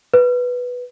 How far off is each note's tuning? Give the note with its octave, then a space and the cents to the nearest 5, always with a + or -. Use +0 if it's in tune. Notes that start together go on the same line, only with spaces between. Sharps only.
B4 +0